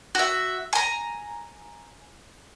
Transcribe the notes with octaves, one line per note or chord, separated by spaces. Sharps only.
F#4 E5
G#5 A#5